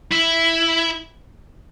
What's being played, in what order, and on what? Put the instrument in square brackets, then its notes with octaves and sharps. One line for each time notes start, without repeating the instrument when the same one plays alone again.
[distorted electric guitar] E4